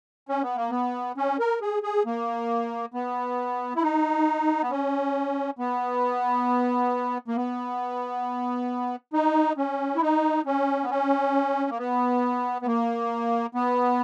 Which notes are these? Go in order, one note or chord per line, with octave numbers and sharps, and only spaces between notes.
C#4
B3
A#3
B3
C#4
A#4
G#4
G#4
A#3
B3
E4
D#4
B3
C#4
B3
A#3
B3
D#4
C#4
E4
D#4
C#4
B3
C#4
A#3
B3
B3
A#3
B3